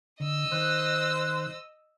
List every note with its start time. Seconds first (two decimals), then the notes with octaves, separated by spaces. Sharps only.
0.20 D3 D#5 E6
0.52 D#3 C5 F#6